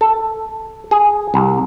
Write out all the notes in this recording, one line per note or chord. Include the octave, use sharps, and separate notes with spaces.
A4
G#4
C2